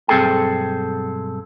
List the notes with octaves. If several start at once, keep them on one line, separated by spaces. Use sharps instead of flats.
B1 G2 C4 G#4 A4 G5